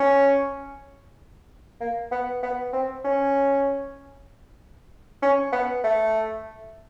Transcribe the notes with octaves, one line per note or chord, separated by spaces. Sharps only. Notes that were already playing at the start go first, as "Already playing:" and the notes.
Already playing: C#4
A#3
B3
B3
C4
C#4
C#4
B3
A3